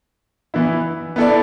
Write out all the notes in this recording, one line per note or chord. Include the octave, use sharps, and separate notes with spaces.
E3 B3 E4
B3 E4 A4 D5